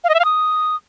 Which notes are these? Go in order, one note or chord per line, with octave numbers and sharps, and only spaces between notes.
F5
D#5
E5
F5
D#6